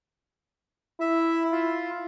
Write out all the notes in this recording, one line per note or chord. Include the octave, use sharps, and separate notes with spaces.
E4 E5
F4